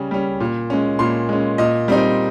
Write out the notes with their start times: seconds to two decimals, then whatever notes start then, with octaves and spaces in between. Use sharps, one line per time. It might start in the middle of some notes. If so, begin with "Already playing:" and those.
Already playing: C#3 G3 C#4
0.11 G3 C#4
0.40 A#2
0.70 G#3 C#4
0.99 A#2 C6
1.29 G#3 C#4
1.58 A#2 D#5
1.88 G3 C4 D#4